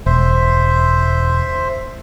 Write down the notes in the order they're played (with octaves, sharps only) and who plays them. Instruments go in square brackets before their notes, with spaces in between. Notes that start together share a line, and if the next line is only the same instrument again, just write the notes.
[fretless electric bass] E1 [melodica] C5 E5